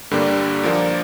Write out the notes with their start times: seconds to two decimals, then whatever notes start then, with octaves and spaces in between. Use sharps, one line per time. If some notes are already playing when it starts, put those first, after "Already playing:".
0.11 G2 D3 G3 A#3 D4
0.63 A#2 F3 A#3 D4 F4